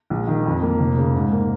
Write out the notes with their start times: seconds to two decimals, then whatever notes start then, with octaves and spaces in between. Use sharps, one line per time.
0.10 A#1
0.27 D#3
0.46 F2
0.62 A#3
0.79 F1
0.97 C#3
1.14 G#2
1.32 A#3